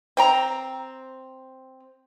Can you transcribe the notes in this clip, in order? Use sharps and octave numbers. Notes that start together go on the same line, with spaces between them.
C4 G5 A#5